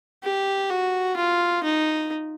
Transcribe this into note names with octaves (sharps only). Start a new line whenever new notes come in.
G4
F#4
F4
D#4